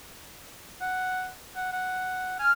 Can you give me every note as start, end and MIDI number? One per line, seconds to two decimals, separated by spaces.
0.81 1.29 78
1.56 1.72 78
1.72 2.36 78
2.39 2.50 80
2.39 2.52 89